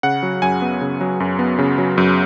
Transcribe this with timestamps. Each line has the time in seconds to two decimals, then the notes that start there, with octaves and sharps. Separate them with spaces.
0.03 C#3 F#5
0.23 F#3
0.42 F#2 G#5
0.62 B3
0.81 C#3
1.01 F#3
1.20 F#2
1.39 B3
1.59 C#3
1.78 F#3
1.98 F#2